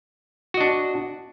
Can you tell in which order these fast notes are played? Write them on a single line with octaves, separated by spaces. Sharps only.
F#4 D#5 D4